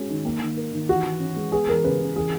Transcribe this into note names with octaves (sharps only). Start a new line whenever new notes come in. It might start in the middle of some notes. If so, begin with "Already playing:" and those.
Already playing: G#3 C#4 F#4
D#3
A#3
D#3
A#4
D#3
E3 F#4
E3
C#4
G#3
B3 G#4
E3 A#4
C#3 B4
C#3
E3 G#4